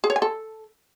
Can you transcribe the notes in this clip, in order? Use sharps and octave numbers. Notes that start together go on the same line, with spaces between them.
G#4
C#5
G#5
A4